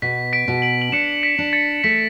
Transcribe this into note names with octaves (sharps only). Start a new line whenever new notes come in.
B2 B6
B6 D7
B2
D7 F#7
F#7
D4 C#7 E7
B6 D7
D4
A6 C#7
A3 B6